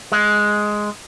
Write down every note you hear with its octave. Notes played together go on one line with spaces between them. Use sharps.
G#3